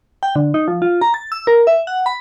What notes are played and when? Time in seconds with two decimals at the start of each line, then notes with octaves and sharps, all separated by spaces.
0.23 G5
0.36 D3
0.54 D#4
0.68 F3
0.82 F4
1.01 A#5
1.14 A6
1.32 E6
1.47 A#4
1.67 E5
1.87 F#5
2.06 B5